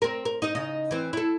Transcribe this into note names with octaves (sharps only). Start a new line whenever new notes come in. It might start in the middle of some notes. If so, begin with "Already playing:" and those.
C4 A#4
A#4
D#4 D#5
C#3 D#4
E3 C4
E4 A4